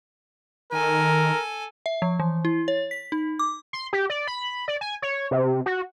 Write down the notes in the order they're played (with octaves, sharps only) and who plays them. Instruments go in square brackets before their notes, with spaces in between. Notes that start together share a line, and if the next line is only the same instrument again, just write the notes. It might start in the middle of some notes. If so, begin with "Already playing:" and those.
[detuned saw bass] D#3 [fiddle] A4 G#5 [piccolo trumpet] A#4
[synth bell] E5
F3
E3
E4
C#5
B6
D#4
D6
[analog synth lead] C6
G4
D5
B5
D5
G#5
C#5
C3
F#4